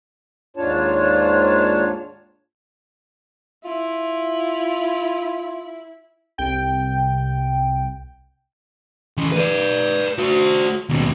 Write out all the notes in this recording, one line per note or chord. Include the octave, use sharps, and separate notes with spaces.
D#2 G#2 D4 F4 C#5 A5
E4 F4
C2 G5
E3 C#4
B4 D5
F#4 C5
D#2 B2